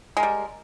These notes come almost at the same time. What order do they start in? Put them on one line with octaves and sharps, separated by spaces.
G#3 A#4 G3